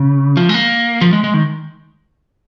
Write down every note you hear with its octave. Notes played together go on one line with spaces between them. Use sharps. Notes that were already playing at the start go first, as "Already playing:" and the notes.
Already playing: C#3
F3
G#3
A#3
F3
G#3
G#3
D#3